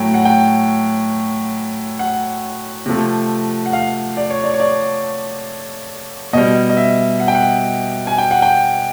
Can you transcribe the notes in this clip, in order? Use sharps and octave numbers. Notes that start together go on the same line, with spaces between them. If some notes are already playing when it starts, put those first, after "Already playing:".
Already playing: A2 F#3 A3 G5
F#5
G5
F#5
C3 F3 A3
F#5
F5
D5
C#5
D5
C#5
D5
B2 G3 D#5
D#5
E5
F#5
G5
F#5
G#5
G5
F#5
G5